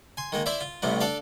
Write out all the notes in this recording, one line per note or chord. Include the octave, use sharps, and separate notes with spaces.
G#5 C6
D#3 G#3 A#3
E4 C5 D5 E5
F4
A1 A2 C3 G3 B3
D4 A4 D5 F5